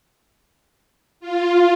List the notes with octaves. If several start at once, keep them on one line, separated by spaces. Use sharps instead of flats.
F4